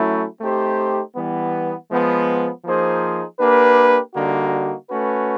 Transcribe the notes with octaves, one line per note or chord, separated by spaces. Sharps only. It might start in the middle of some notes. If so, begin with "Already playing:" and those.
Already playing: F#3 A3 C#4 E4
A3 C4 D#4 G4 C5
E3 G3 B3
F3 G#3 B3
F3 A#3 D#4 G#4 C5
A#3 D4 G4 B4
D3 G3 A#3 D#4 F#4
A3 C#4 F#4 B4